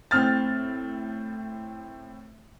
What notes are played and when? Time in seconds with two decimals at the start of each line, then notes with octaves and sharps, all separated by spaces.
0.11 A2 C4 F6 A6